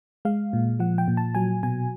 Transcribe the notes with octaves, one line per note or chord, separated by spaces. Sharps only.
G#3 F5
A#2
F3 F#5
G5
A#2
A5
F#3 G#5
B2 G#5